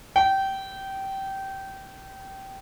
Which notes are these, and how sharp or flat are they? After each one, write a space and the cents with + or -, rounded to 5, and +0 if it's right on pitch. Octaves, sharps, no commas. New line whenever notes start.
G5 -20